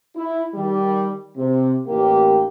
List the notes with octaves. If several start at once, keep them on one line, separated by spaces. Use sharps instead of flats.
E4
D#3 G3
C3
A1 D#2 A#3 G4